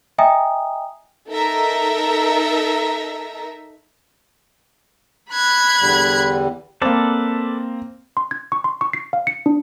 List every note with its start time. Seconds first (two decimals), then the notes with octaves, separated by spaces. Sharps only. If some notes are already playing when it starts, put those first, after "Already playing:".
0.18 D#5 E5 G5 G#5 A#5 D#6
1.29 D#4 A4 A#4 E5 A#5
5.32 B5 F#6 G#6
5.80 E2 D3 G3
6.82 A#3 C4 A4 B4 D5
8.17 C6
8.31 G#6
8.52 C#6
8.64 C6
8.81 C#6
8.93 C7
9.13 F5
9.27 C#7
9.46 D4